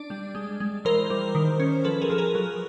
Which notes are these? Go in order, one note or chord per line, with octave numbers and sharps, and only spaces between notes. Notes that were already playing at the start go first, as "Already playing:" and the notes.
Already playing: D4 D5
G3
G#3
G#3
E3 A#4 C5
G3
D#3
C#4
F3 A4 B4
G#4 A#4
F3 A4
G#4 A#4
F#3